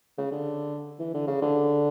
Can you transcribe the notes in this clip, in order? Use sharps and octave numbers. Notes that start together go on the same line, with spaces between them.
C#3
D3
E3
D3
C#3
D3